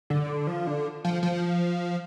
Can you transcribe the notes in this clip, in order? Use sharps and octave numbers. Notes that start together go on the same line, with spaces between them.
D3
F3
D3
F3
F3